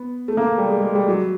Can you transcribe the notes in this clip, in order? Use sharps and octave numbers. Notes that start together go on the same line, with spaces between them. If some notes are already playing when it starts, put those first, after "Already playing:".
Already playing: B3
A3
A#3
G3
G#3
G#3
G3
F#3